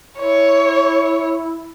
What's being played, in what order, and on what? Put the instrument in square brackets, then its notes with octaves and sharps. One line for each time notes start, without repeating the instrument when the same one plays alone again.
[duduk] E4 [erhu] C#5